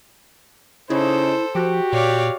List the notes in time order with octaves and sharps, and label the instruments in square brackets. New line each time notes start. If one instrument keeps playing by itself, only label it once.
[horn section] C#3 D#4 [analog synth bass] E4 [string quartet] A4 C5
[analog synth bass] F3 [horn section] F#4 G4
[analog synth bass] A#2 [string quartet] C#5 D5 F5